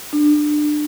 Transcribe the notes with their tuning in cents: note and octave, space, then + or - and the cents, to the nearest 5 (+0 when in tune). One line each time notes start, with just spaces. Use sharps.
D4 +25